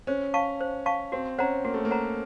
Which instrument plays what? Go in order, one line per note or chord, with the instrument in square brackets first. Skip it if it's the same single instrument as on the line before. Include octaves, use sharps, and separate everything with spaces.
[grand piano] C#4 [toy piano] C5
[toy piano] F5 A5 C#6
C5
F5 A5 C#6
[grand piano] C4 [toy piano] F#4
[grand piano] C#4 [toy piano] C5 F#5 A#5
[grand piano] A#3 [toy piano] F#4
[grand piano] A3
A#3
[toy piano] C5 F#5 A#5